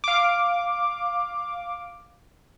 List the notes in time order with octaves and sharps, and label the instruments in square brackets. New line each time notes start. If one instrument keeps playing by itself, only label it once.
[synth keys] F5 D6